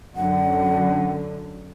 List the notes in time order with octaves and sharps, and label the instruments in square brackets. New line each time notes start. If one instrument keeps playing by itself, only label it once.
[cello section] F#2 D3 [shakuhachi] F#5